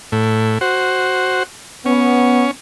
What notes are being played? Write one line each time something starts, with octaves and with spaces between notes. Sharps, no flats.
A2
F#4 C5
B3 C#4